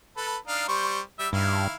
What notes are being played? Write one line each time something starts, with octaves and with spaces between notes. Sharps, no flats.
A4 B4
D4 D#4 F5
G3 C5 C#6
G3 E5
G2 D#3 E4 F5